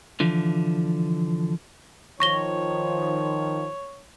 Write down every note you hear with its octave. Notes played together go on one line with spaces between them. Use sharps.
D3 E3 F3
D#3 F3 C#5 C#6 A#6 G7